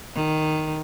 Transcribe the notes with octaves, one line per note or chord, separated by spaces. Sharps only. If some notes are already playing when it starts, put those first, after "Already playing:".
D#3